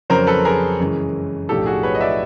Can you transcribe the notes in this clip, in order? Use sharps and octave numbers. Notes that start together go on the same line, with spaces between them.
F2 C#3 F#3 A#4 C5
A4 B4
G#4 A#4
F#2 C#3 E3 G#3 C#4
B1 A2 F3 A3 D4 G4 A4
F#4 G#4
B4 C#5
D#5
D5 E5